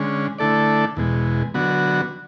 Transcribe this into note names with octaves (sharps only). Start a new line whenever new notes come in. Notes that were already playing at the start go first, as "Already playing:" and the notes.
Already playing: D3 G#3 C#4
D3 A3 E4 A4 D5
E2 B2 G#3
D3 F#3 B3 F#4